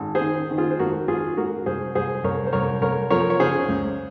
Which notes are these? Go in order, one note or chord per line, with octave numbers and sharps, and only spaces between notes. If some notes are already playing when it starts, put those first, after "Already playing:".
Already playing: G#1
G#4 C5
D#3
D#3
F4 G#4
C5
G#1 F#4 A#4
G#1 F4 G#4
G#2 F#4 A#4
C2 G#4 C5
C2 G#4 C5
C2 A#4 C#5
C5
C2 A#4 C#5
C2 A#4 C#5
F3 A#4 C#5
C#5
C#3 G#4 C5
C#2